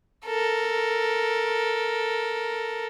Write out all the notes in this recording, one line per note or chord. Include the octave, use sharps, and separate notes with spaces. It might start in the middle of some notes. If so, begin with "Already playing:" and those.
A4 A#4